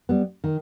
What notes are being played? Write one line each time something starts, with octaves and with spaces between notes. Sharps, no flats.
G3 B3
D#3